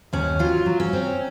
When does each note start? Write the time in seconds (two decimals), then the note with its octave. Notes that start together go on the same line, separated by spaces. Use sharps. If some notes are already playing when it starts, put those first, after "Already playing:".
0.13 D#2 C#4
0.39 F#3 F4
0.66 F#3
0.80 C#4
0.93 C4